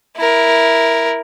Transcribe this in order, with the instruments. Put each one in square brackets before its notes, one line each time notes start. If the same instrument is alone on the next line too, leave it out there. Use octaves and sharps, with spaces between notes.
[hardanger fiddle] E4 A#4